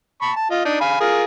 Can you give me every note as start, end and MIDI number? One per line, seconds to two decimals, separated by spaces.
0.22 0.32 81
0.22 0.32 83
0.22 0.32 85
0.36 0.48 81
0.51 0.64 65
0.51 0.64 75
0.65 0.80 62
0.65 0.80 63
0.81 1.00 77
0.81 1.00 80
0.81 1.00 83
1.01 1.24 65
1.01 1.24 68
1.01 1.24 70